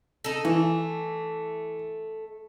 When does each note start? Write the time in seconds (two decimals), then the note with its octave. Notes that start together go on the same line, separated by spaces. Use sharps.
0.24 D#4 A4
0.45 E3 A3